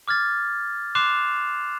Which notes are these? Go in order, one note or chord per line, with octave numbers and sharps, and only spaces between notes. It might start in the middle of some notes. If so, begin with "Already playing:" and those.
D6 F6 G#6 A6
C6 D6 F#6 C7 E7 F7